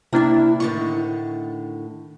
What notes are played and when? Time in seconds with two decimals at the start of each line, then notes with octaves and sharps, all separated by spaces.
0.13 C3 A#3 D4 E4 E5
0.60 A2 D3 D#3 C#6 A6